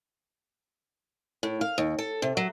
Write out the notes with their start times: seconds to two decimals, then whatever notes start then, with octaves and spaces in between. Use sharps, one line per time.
1.43 A2
1.61 F5
1.78 D#2
1.99 A4
2.22 C3
2.37 F#3